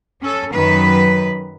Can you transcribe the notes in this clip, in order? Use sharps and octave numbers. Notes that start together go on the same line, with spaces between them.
C#4 A4
F#2 D#3 F#3 B4